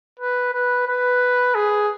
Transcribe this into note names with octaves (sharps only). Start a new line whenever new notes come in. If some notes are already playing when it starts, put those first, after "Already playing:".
B4
B4
B4
G#4